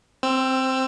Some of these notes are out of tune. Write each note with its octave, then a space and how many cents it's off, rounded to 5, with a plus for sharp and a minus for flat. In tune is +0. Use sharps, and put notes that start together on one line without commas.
C4 +0 E6 +20